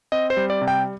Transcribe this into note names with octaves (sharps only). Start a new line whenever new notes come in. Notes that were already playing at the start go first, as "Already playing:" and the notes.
C4 D#5
C5
G3
D5
C3
G5